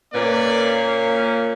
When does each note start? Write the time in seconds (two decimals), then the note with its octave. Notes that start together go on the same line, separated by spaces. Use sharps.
0.12 A#2 A#3 C#4 B4 D5